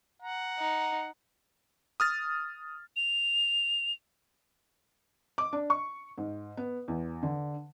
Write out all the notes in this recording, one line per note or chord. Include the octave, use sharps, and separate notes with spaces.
F#5 A#5
D#4
D#6 F6 A6
F7
D6
D4
C#6
G#2
B3
E2
D3